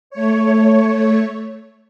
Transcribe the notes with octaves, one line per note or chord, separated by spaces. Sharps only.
A3 C#5